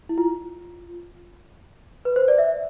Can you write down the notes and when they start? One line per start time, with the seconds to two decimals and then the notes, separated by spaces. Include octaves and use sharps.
0.09 E4
0.18 F4
2.05 B4
2.16 C5
2.28 D5
2.38 E5